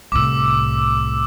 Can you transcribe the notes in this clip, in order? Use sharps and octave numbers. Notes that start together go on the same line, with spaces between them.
C2 A2 D6 E6